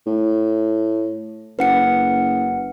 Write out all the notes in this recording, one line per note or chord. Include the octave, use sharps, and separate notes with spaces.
A2
F#1 B4 F#5 C#7